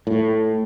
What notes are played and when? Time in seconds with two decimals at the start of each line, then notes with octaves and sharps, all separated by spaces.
0.07 A2